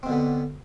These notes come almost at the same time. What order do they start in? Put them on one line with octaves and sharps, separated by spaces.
C4 B2 D3 B3